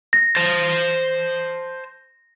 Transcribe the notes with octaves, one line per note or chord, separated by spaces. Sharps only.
A#6
C5 A5